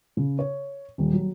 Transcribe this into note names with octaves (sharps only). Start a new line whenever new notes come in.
C#3
C#5
D#1
F#3